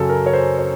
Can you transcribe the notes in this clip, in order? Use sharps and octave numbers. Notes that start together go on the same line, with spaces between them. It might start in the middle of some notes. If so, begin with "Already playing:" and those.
Already playing: F#2 C#3 F#3 A4
A#4
C#5
C5
C#5